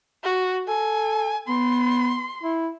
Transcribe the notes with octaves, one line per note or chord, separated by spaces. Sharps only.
F#4
A4 G#5
B3 C6
E4